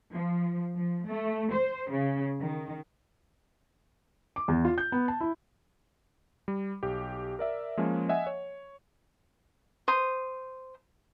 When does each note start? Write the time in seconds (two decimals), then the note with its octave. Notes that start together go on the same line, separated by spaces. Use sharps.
0.13 F3
0.76 F3
1.07 A3
1.51 C5
1.91 C#3
2.40 D#3
4.36 D6
4.48 E2
4.65 F4
4.78 G6
4.92 B3
5.08 A5
5.20 E4
6.48 G3
6.83 B1 G4
7.39 A#4 D5 E5
7.77 F3 G#3 A#3 C#4
8.09 D#5 E5 F#5 G#5
8.27 C#5
9.88 C5 D#6